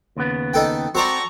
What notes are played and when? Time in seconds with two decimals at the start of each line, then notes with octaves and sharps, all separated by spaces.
0.17 D#2 C#3 B3
0.54 D#4 A4 G5
0.95 C4 F#4 A4 C5 D5 A#5 C#6